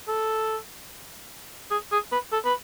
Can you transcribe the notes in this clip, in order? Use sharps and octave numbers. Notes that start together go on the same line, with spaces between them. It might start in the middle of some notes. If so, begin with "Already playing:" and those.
A4
G#4
G#4
B4
A4
B4